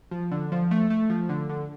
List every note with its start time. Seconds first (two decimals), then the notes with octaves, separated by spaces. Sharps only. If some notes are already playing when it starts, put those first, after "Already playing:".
0.11 F3
0.31 D3
0.52 F3
0.71 A3
0.90 A3
1.10 F3
1.29 D3
1.49 D3